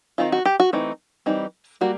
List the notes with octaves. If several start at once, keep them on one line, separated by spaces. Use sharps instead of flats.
D#3 G3 C4 D#4 F4
F#4
G4
F#4
E3 A3 C4 D#4
E3 G3 C4 D#4
G3 A#3 F#4